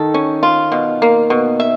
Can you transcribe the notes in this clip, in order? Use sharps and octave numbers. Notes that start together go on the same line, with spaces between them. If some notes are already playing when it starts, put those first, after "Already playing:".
Already playing: D#3 A4
C#4
F4
B2
A#3
B2
E5